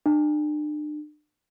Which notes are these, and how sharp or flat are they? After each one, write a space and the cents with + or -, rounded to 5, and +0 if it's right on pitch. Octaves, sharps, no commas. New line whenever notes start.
D4 +40